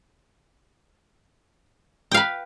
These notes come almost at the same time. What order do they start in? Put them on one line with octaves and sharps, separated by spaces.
G5 F5 B4